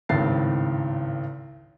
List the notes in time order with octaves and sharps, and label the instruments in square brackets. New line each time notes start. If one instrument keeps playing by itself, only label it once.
[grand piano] G#1 C#2 A2 C4 A6 C7